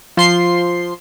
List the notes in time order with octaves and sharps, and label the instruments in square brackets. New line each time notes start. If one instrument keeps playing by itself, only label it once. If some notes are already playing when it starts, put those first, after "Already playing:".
[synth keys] F3 C6 C7